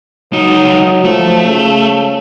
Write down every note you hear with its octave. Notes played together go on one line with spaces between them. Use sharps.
C#2 F#3 D#4
F3 A3
C#3